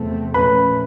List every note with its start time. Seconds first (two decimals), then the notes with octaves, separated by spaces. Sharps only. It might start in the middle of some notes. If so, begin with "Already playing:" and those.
Already playing: E2 C3 F3 A3 C4
0.34 A#2 F3 A3 C#4 B4 B5